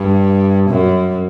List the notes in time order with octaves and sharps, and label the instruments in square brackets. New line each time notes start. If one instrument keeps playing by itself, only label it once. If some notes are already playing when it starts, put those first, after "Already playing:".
Already playing: [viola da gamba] G2
F#2